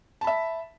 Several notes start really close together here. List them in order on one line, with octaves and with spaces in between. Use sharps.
A5 B5 E5